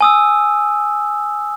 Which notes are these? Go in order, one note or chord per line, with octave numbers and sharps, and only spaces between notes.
G#5 D#6 E6